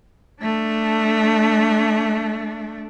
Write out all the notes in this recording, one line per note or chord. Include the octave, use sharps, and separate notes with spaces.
A3 D4